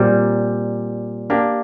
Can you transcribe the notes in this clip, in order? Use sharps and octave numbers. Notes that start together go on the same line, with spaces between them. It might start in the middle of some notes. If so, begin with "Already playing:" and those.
Already playing: A#2 G3 C4
A#3 D4 G4